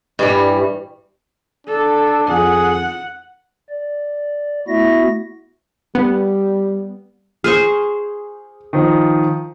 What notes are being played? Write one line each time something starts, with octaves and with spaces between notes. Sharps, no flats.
G2 E3 G3
D4 A4
F2 G#4 F#5
D5
A3 B3 E4 F#4 E5 A#6
G3 B3
G#4 C5 C#6 F6
D#3 F3